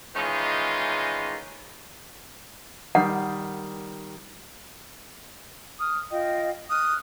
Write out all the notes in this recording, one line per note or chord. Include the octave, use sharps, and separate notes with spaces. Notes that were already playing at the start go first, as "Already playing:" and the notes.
D#3 E3 G#3 C#4 D#4 F4
D#3 G3 F#5
D#6 F6
F4 D#5 G5
D#6 F6 F#6